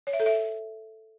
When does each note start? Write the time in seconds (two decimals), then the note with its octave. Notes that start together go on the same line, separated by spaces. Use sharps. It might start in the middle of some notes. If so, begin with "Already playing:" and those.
0.07 C#5
0.13 E5
0.20 A4
0.26 E5